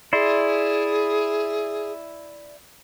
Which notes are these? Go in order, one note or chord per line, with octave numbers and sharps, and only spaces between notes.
E4 G#4 D5 C6